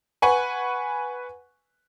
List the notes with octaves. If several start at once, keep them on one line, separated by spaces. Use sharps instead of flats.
B4 F#5 G#5 C#6